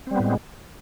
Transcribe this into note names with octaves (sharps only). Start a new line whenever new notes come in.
A2 G3 G#3 B3 C4